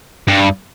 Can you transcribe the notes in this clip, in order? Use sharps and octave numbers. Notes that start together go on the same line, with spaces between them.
G2